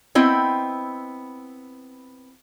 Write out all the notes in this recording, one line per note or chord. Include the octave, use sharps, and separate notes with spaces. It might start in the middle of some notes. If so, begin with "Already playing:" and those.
B3 C4 E4 D#5 G5